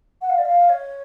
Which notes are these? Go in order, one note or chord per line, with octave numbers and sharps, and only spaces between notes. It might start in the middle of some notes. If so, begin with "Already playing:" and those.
F#5
F5
D5
F5
C#5